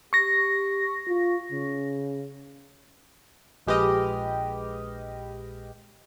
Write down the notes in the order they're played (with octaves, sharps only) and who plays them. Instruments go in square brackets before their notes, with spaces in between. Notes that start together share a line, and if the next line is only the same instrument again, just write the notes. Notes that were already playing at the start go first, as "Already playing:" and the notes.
[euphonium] G4 [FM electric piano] C#6 A#6
[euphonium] F4
C#3
[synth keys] A#1 G#3 G4 B4 D#5 F6